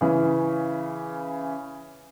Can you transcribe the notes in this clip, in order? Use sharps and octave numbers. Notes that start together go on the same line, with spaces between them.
C#3 E3 C#4